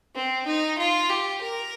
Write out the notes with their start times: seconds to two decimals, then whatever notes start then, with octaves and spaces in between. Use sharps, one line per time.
0.15 C4
0.47 D#4
0.79 F4
1.09 G4
1.41 A#4